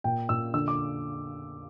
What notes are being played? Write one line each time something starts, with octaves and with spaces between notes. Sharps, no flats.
A#2 G5
A#2 E6
D3 E6
D6